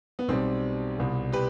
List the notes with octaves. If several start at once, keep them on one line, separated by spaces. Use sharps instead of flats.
B3
B1 B2 G3 C4
C2 B2 G3
G4 B4